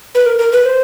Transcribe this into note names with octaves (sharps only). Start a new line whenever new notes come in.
B4
A#4
A#4
B4
C5